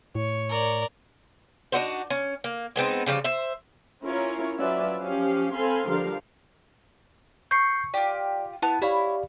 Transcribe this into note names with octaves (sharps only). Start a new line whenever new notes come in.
A2 C#5
A#4 D5
D4 D#4 F#4 C5
C#4
A#3
G#3 B3 C4 D#4
C#3 F3 G3 F4
C5 E5
C#4 E4 F4 A#4 C#5
F#3 C#4 F4 B4 D5 E5
F3 C#4 G4 F5
C4 A4 F5 G#5 B5 C6
D3 F3 G3 A#4 F5
C#6 G6 C7 C#7
F4 G4 D5
B3 E4 A5
E4 G4 C#5 D5 F5